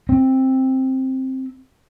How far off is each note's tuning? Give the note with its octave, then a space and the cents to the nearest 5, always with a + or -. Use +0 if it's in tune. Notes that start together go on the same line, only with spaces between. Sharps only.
C4 +10